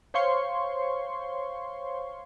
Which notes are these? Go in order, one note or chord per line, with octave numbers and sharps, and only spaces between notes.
C5 C#5 F5 C6 C#6